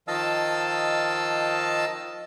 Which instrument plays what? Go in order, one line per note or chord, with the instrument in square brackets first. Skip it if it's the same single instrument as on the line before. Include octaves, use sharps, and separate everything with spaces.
[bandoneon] D#3 F3 D#5 F5 A5 E6